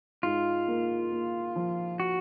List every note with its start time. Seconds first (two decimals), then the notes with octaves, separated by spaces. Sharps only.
0.23 G#2 F4
0.68 A#3
1.12 A#3
1.56 F3
2.00 F#4